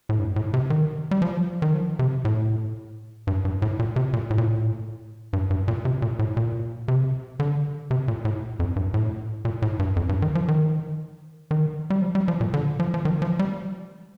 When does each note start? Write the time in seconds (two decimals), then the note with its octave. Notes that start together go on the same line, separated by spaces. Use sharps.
0.09 A2
0.19 G2
0.36 A2
0.54 C3
0.70 D#3
1.11 G3
1.22 F3
1.62 D#3
1.74 F3
1.99 C3
2.25 A2
3.27 G2
3.45 G2
3.62 A2
3.79 A#2
3.96 C3
4.13 A#2
4.30 A2
4.38 A#2
4.45 A2
5.33 G2
5.50 G2
5.68 A#2
5.85 C3
6.02 A#2
6.19 A2
6.37 A#2
6.88 C3
7.40 D3
7.91 C3
8.08 A#2
8.25 A2
8.60 F2
8.76 G2
8.94 A2
9.45 A#2
9.62 A2
9.79 G2
9.96 F2
10.09 G2
10.22 D#3
10.35 F3
10.48 D#3
11.51 D#3
11.90 G3
12.02 F3
12.15 G3
12.28 F3
12.41 A#2
12.54 D3
12.80 F3
12.94 F3
13.05 D#3
13.22 F3
13.39 G3